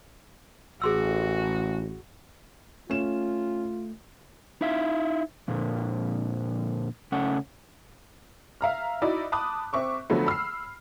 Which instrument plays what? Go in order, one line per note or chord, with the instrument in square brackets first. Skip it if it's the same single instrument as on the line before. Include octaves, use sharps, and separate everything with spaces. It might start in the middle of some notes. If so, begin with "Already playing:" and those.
[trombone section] A1 [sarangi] F#4 [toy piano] G#4 C6 E6
[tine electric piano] A3 [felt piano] C#4 E7 [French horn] F4
[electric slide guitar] D#4 E4 E5 F5
F2 A#2 D3
C#3 A3 C#4 F#5
[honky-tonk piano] E5 F5 A#5 F6
D#4 E4 F#4 D5
A5 B5 D6 D#6 F#6
C4 E5 C#6 D6
D3 F3 F#3 A3 B3
B5 E6 F6 C7